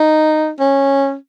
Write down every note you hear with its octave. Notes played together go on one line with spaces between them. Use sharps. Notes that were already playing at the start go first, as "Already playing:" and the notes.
Already playing: D#4
C#4